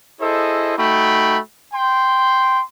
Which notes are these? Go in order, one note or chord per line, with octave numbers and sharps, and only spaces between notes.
E4 G#4 A4 C5 D#5
A3 D#4 F#4 G5 B5
G5 C6